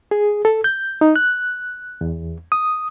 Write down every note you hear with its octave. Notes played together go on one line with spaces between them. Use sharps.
G#4
A4
G6
D#4
F#6
E2
D#6